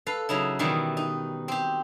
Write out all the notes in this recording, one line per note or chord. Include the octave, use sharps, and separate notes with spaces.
A4 B4 F5
C#3 F#3 D#4 E4
B2 D#3 E3 G3
D#4
C4 G4